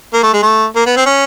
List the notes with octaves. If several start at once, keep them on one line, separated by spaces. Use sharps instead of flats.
A#3
A3
G#3
A3
A#3
B3
C4
C#4